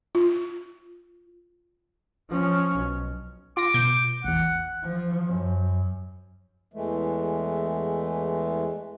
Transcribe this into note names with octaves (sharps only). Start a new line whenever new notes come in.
F4
F3 C#4
B1
F4 D6 A#6
B2 G6 D7
A1 E2 F#5
F3
F#2
E2 E3 G#3 A3